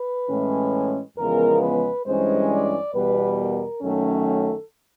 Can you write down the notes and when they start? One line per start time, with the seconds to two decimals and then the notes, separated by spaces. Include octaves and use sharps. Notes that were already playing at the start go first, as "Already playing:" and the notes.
Already playing: B4
0.30 A2 E3 G#3 C#4
1.18 E2 C#3 F3 G#3 B3 A#4
1.61 B4
2.05 G2 E3 G#3 C#4 C5
2.51 D5
2.94 E2 B2 G3 B4
3.38 A#4
3.82 F#2 D#3 F#3 A3 C#4 A4